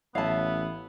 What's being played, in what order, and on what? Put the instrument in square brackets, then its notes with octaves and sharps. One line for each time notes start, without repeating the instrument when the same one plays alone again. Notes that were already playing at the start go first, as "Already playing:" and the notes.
[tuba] A1 [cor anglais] B3 [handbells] C#5 E5 [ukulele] F5 A5